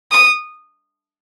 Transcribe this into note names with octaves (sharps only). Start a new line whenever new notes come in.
D#6